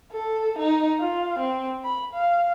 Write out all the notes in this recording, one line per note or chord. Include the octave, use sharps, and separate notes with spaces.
A4
D#4
F4
C4
B5
F5